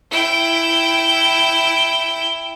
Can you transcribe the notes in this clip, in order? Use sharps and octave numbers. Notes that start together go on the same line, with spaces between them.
E4 G5